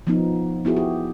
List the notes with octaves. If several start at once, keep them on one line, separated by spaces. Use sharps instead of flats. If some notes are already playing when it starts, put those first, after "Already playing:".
F3 B3 D#4
B3 E4 F#4 G#4
G4